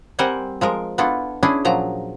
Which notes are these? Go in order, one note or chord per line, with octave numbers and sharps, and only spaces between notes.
G3 C4 A#4 C5 F#5 G#5
F3 G#3 A#4
B3 D4 E4 F4 A4
C#4 D4 E4 G#4
A#2 F3 F#3 A#5